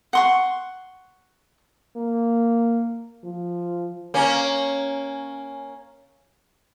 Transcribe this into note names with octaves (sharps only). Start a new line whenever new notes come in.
F#5 C6 C#6
A#3
F3
A#3 C#4